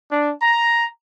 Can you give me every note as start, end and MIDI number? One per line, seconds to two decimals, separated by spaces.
0.10 0.32 62
0.42 0.85 82